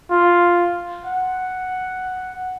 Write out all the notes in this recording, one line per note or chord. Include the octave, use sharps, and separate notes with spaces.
F4
F#5